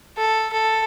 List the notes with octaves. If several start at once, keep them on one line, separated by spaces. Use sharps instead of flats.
A4
A4